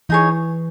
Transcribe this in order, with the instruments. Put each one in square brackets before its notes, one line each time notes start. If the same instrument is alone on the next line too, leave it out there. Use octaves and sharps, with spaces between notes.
[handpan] E3 [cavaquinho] D#4 G#4 C#5